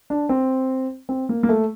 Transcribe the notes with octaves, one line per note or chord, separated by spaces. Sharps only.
D4
C4
C4
A#3
A#3
A3